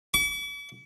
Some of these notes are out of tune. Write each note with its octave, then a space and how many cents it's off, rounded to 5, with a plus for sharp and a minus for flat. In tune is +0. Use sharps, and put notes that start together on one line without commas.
D6 -45